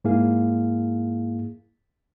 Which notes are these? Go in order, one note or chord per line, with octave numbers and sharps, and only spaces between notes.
G#2 A#3 E4 G#4 F5